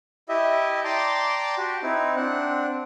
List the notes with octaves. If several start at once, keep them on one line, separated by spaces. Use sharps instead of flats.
E4 G4 D#5 E5
D5 G5 A5 A#5 C6 D6
F#4 G4
C4 D#4 E4
C4 D4 F#5